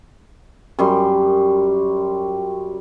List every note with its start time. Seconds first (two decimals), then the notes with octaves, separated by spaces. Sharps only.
0.79 F#2 G3 C6